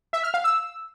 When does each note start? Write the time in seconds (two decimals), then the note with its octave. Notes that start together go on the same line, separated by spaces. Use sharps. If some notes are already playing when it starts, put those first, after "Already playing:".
0.13 E5
0.23 F6
0.34 F5
0.44 E6